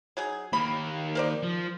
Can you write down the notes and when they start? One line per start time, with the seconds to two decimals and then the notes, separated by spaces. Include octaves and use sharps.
0.17 F#3 D#4 G#4
0.53 D#2 A#3 B5
1.15 A#4 C5 D5
1.43 F3